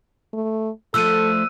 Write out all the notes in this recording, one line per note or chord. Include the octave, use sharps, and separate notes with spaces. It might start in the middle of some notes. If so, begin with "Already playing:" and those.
A3
F3 A3 D4 A4 E6 F#6 D#7